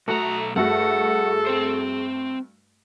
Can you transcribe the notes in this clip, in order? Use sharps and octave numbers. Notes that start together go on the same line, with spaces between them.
B1 A3 F#4 A4 A#5 D#6
G2 A3 F#4 G#4 A4 F#5
C4 C5